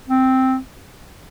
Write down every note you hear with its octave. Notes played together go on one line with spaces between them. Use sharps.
C4